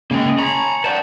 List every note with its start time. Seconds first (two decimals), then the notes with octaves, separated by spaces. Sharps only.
0.11 C#3 G#3 A#3 G5
0.26 C#3 D#5
0.39 C#5 G#5 A#5 B5
0.84 B4 D5 F#5 G5 A5